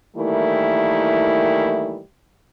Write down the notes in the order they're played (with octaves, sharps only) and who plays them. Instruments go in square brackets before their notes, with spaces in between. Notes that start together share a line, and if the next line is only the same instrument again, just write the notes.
[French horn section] D#3 E3 G3 A3 A#3 E4